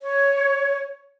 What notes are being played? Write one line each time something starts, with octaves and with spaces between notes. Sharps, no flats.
C#5